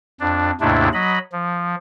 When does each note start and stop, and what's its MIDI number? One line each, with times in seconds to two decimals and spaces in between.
0.20 0.51 41
0.20 0.51 62
0.61 0.88 39
0.61 0.88 44
0.61 0.88 48
0.61 0.88 57
0.61 0.88 62
0.61 0.88 64
0.93 1.18 54
0.93 1.18 75
0.93 1.18 83
1.32 1.75 53